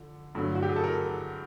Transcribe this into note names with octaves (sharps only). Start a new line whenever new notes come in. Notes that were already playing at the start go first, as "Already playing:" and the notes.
Already playing: D3 F3
G2 D3 F#3 A3
F#4
G4
G#4
A4
A#4